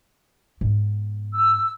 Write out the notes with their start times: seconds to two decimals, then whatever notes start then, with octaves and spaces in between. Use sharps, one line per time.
0.61 G#2 B3
1.33 E6